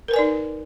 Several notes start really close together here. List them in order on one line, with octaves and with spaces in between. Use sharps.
A#4 B4 G#5 D5 D#4